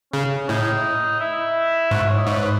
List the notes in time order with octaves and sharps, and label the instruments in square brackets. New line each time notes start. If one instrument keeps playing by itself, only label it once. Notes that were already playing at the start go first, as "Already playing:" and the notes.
[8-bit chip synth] C#3 [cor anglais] C#4
[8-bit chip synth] A2 [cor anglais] D#4
[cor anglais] E4
[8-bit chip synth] G#2 [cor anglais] F#4
[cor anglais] E4
C#5
D#5
[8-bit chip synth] G#2 [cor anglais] C#5
[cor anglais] B4